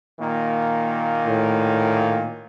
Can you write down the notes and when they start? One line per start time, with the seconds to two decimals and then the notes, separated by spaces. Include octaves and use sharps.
0.19 A#2 D#3 A#3
1.25 A2